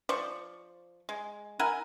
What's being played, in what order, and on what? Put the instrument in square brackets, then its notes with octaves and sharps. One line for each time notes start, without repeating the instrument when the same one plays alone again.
[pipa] F3 C5 D5 C#6
G#3
E4 A#4 F#5 G#5